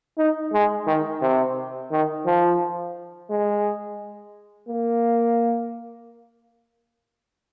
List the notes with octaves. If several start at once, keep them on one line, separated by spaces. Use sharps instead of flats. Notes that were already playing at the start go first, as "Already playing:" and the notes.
D#4
G#3
D#3
C3
D#3
F3
G#3
A#3